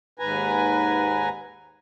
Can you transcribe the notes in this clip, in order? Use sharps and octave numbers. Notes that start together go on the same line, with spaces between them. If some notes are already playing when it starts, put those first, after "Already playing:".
D#2 G#2 B4 G#5 A#5